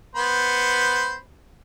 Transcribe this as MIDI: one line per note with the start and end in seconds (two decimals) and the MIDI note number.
0.15 1.15 59
0.15 1.15 72
0.15 1.15 83